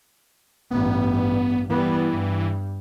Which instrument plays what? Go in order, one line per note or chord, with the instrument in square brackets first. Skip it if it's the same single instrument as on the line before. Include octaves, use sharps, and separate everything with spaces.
[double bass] A1 G2 [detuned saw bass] B3
[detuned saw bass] E3 [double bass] G3 B3
[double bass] G2